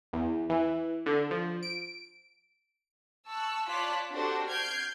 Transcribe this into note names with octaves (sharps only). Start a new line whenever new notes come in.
E2
E3
D3
F3
D7
A5 C#6 E6 F#6
F4 C#5 D5 A5 F#6 B6
D4 F#4 G4 A4 C5
F6 G6 G#6 C7 D7